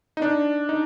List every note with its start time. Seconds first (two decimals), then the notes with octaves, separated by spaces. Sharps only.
0.17 D#4
0.22 D4
0.69 D#4